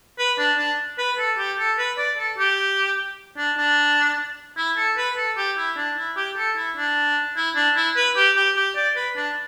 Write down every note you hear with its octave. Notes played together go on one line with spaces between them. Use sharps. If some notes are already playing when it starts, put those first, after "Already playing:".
B4
D4
D4
B4
A4
G4
A4
B4
D5
A4
G4
D4
D4
E4
A4
B4
A4
G4
E4
D4
E4
G4
A4
E4
D4
E4
D4
E4
B4
G4
G4
G4
D5
B4
D4